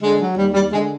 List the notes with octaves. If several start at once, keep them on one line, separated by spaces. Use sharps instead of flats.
D3 G#3
F#3
D#2 G3
D#2 G3
D3 G#3